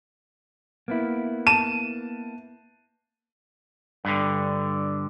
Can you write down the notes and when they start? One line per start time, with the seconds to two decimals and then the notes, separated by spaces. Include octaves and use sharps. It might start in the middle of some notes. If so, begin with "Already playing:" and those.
0.88 A#3 B3 E4
1.47 A5 D#7 E7
4.05 G2 D3